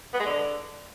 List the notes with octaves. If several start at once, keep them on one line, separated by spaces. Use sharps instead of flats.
B3
G#3
D3